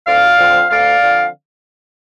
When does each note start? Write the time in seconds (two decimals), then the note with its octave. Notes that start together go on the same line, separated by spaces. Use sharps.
0.07 D2 D5 F5
0.38 D3 F3 C4
0.70 D2 D5 F5
1.01 D3 F3 C4